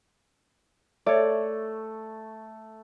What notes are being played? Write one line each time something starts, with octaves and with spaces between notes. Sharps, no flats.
A3 C#5 D5